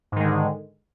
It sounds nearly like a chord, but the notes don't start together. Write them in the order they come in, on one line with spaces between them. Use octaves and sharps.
G#2 D#3 G#3 D3